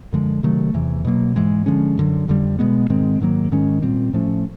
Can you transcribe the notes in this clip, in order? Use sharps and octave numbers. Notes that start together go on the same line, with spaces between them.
F#2 D3 F3 G#3
C3 D#3 F#3 A3
E2 C3 E3
B2 F#3 A#3
G#2 E3 G#3
D3 F3 G#3 C#4
F#2 D3 F#3
F2 D3 G3
B2 G#3 B3
G#2 D#3 G#3 C4
G#2 D#3 F#3 A#3
G#2 D#3 G#3 C#4
A#2 G3 C4
A2 F3 A3 C#4